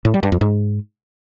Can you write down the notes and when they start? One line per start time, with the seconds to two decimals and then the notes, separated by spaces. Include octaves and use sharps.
0.05 A2
0.14 G3
0.23 G2
0.32 F2
0.41 G#2